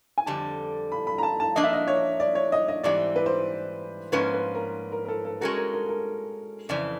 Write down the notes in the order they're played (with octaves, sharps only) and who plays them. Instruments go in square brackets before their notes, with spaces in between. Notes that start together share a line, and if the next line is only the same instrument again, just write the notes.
[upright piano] G#5
[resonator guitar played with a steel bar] F2 D3 G3 [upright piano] A5
[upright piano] B5
B5
A#5
A5
A5
[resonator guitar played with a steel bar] F3 A#3 D4 [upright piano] D#5
[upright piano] E5
D#5
C#5
D5
C#5
D#5
D#5
[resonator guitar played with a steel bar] G#2 E3 G3 C4 [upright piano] D5
[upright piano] B4
C5
[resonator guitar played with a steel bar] G#2 F3 A#3 C#4 [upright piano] B4
[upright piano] B4
A#4
A#4
A#4
A4
A4
[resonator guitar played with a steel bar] G#3 C#4 F#4 A4 [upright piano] A#4
[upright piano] A#4
A#4
A#4
[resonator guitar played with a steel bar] F2 C#3 E3 [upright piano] D5